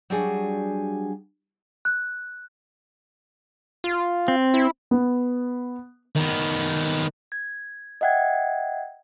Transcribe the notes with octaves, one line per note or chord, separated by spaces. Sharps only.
F#3 G3 D4 F#4 G#4
F#6
F4
C4
E4
B3
D#3 B3
G#6
D#5 E5 F#5 G5 G#6